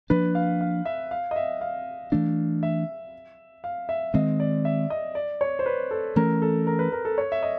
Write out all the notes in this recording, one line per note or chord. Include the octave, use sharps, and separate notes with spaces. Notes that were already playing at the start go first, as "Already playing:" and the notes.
F3 A#3 D4 B4
F5
F5
E5
F5
D#5
E5
F5
E3 A3 D4
E5
F5
E5
D#3 G#3 C4 D#5
D5
E5
D#5
D5
C#5
C5
B4
A4
E3 A3 C#4 A#4
A4
A#4
B4
A#4
A4
C#5
E5
D#5